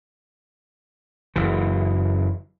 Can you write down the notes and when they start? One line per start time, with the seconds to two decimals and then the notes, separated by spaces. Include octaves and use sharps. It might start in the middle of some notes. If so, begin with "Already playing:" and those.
1.36 F#1 E3